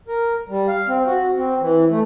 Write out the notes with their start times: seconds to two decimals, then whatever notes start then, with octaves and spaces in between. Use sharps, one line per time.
0.08 A#4
0.49 G3
0.68 F5
0.88 C4
1.06 F#4
1.36 C4
1.60 E3
1.90 A3